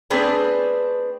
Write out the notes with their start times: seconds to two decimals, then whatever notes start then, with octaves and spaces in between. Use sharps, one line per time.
0.10 A3 B3 C4 D4 G#4 B4